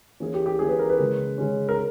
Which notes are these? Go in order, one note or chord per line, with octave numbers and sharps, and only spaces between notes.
E3 A#3 C#4 G#4
G4
G4
E3 A#3 C#4 G#4
B4
A#4
B4
C#3 G#3 C#4
C#3 G#3 C#4
A#4